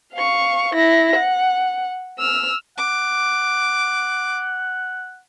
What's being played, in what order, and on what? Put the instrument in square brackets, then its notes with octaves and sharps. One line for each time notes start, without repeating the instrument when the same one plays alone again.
[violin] F5 C#6
E4 A#6
F#5
E6 F6
[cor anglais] F#5 [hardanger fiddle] D6